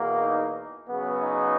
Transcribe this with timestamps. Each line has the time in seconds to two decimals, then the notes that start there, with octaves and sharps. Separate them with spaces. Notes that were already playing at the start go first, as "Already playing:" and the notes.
Already playing: E2 B2 A#3
0.21 D#4
0.88 C#3 F#3 B3
1.22 D#4